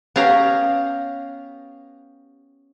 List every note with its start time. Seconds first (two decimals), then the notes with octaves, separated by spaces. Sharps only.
0.16 B3 C#4 G4 F5 A#5